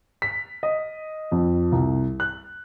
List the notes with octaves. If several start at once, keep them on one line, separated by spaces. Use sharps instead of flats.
B6
D#5
F2
C2
F#6